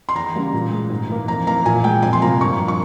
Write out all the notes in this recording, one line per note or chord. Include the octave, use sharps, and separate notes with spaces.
C6
E2 A#5
C#3 G3 A#3
A#2
G#3
G#2
E3 A#3
F2 A#5
E3 A#3 A#5
A#2 G#5
G#3 G5
F2 G#5
C6
C3 F3 A#3 A#5
G2 C#6
F3 A#3
C#6